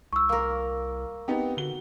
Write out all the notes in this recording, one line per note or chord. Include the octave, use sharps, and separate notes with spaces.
C2 C#6 E6
A#3 A#4
B3 C4 D#4 G4
D3 F#4 G7